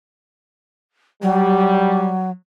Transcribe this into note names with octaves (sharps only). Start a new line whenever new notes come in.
F#3 G3